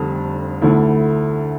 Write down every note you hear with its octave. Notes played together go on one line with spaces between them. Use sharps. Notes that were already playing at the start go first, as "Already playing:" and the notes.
Already playing: F1 F2 D3 G3
D2 D3 A3 E4